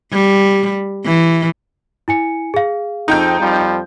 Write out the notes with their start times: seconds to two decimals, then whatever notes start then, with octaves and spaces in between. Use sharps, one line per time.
0.12 G3
1.05 E3
2.08 E4 G#5 C#7
2.54 G#4 F5
3.08 F2 D#4 G5 G6
3.40 F2 F3 G3